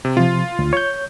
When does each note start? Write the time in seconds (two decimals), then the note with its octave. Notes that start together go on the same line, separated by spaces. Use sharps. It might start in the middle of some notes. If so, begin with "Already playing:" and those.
0.05 C3
0.17 C3 F3 F4
0.59 D2
0.73 C#5 G6